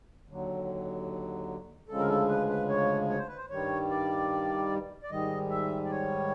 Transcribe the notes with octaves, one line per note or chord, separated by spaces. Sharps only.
D#2 D3 F#3
D2 C#3 F3 G#3 A4
A#4
A4
B4
B4
C#5
C#5
C5
B4
C5
G2 D#3 G3 C#5
D5
D5
G#2 D#3 G3 D#5
E5
D5
C#5